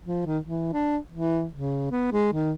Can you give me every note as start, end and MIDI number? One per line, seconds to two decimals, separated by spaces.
0.06 0.23 53
0.26 0.39 51
0.46 0.71 52
0.73 0.98 62
1.12 1.47 52
1.53 1.88 49
1.92 2.10 59
2.13 2.33 56
2.34 2.53 51